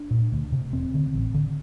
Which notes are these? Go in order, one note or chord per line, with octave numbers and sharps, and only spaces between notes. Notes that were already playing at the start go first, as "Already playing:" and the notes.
Already playing: D4
A#2
D2
C3
E1 C4
D2 D3
A1
D3